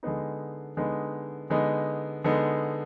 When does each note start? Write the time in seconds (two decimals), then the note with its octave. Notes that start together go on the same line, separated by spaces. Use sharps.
0.03 D3 G#3 B3 D#4
0.77 D3 G#3 B3 D#4
1.50 D3 G#3 B3 D#4
2.24 D3 G#3 B3 D#4